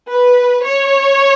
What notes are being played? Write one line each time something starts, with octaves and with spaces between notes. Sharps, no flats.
B4
C#5